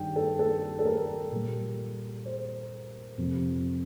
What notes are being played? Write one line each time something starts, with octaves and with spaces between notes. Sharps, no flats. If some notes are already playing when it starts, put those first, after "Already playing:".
Already playing: G2 D#3 G3 G5
A4
A4
A4
A#4
A#2 G3
C5
F2 C3 F3